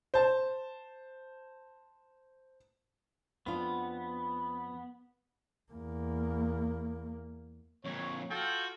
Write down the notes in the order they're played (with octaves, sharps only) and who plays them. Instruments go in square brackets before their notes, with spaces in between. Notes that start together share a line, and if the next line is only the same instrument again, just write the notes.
[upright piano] C5 A5
[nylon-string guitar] F2 D4 F4 [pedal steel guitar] B3
[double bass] E2 A#3
[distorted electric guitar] F2 A#2 [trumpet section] C#5
[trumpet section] F4 A4 G5 [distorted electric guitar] F#4